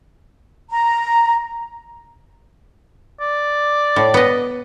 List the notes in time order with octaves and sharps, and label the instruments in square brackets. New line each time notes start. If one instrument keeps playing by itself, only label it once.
[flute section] A#5
[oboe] D5
[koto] A2
B3 D#5